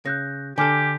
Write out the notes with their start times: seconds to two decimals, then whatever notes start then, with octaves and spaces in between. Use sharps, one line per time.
0.06 C#3 F#6 G6 A#6
0.58 D3 G4 A4 G#5 D6 F6